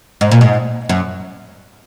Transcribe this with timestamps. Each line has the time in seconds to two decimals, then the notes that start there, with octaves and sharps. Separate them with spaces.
0.21 G#2
0.31 A#2
0.41 G#2
0.89 F#2